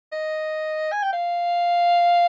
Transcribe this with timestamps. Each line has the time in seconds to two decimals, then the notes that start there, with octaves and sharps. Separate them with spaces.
0.12 D#5
0.92 G#5
1.03 G5
1.13 F5